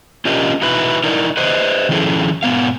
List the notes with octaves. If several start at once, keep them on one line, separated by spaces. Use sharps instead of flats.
C#4 D4 F4 G4 A#4 D#5
D#4 E4 F#4 B4
D#4 E4 A#4 D5
B4 C5 D#5
D#3 F3 C#4 E4 G#4 A4
G#2 B2 B3 F5